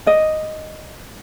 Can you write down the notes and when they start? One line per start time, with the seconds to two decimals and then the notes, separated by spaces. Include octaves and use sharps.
0.06 D5 D#5